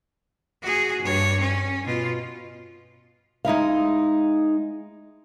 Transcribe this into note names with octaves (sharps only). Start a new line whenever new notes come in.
F#4 G#4
G2 C#5
C#4
B2 F4
G#3 D#4 E4 F5